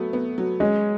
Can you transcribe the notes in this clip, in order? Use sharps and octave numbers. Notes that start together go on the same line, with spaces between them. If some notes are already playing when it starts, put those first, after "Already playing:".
Already playing: F#3 A3 B3
B3
F#3
G#3 C#4